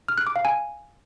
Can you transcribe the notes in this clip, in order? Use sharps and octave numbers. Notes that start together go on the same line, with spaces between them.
F6
F#6
D6
F5
G#5